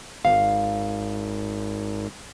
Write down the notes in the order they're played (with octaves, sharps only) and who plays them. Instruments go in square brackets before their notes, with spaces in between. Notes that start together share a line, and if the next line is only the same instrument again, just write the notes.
[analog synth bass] G#1 [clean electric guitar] F5